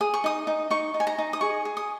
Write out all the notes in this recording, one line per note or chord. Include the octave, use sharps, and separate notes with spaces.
G#4 D#6
C#6
D#4 D#6
D#4
D#4 C#6
D#4
G#5
A#5
D#4
D#6
G#4 C#6
G#4
D#6